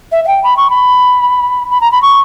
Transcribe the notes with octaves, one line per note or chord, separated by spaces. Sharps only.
E5
E5
G5
B5
C#6
B5
B5
A#5
B5
C#6